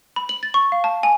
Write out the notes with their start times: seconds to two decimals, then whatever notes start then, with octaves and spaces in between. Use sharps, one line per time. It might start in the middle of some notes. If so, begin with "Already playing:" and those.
0.16 B5
0.29 F#7
0.43 A6
0.54 C#6
0.72 F5
0.84 A5
1.03 G#5